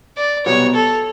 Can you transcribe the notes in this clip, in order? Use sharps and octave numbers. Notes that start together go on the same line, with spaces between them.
D5
C2 B2 F#3 B3 C#5
A4